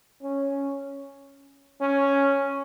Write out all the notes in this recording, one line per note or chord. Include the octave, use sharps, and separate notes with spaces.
C#4
C#4